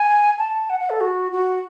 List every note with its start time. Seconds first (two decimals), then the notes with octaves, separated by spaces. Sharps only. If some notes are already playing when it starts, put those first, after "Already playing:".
Already playing: G#5
0.38 A5
0.69 F#5
0.80 F#5
0.89 A4
1.00 F#4
1.31 F#4